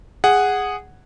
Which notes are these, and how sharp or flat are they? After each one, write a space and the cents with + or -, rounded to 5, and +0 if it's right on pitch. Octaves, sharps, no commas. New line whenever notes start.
G#4 -10 F#5 +0